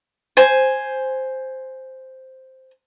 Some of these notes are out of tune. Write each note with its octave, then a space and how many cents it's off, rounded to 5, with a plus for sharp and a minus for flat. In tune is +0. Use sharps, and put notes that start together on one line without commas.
C5 +0 G#5 +0